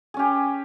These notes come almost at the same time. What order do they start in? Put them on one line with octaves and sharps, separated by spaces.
G#4 C#4 G4